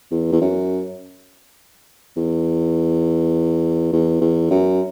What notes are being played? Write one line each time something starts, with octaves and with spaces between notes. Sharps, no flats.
E2
E2
F#2
E2
E2
E2
F#2